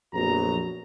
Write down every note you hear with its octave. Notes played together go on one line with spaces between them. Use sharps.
A#1 F2 F#3 B3 F#4 A#5